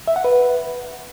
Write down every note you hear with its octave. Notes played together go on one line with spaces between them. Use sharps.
E5
F#5
B4